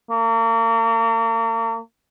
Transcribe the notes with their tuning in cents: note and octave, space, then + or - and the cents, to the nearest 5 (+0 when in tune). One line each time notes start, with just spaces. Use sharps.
A#3 -40